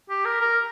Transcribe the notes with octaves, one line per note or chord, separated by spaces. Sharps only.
G4
A#4
A#4